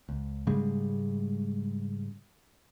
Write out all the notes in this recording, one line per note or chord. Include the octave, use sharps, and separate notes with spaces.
C#2
G#2 C#3 G3 G#3